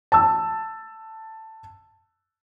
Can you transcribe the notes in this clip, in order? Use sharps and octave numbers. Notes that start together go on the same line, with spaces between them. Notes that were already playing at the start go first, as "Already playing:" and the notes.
A5 E6